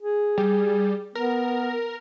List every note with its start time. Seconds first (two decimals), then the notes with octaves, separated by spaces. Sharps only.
0.01 G#4
0.38 G3
1.15 B3 A#4